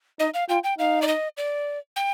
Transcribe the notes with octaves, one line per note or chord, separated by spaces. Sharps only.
D#4 D#5
F5
F4 G5
G5
D#4 F5
D5
D#5
D5
G5